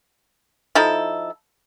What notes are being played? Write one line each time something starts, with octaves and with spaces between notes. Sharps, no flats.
F3 D#4 E4 A4